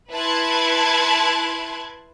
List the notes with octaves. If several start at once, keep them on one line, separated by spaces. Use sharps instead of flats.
E4 B4 A5 C6 F#6 G#6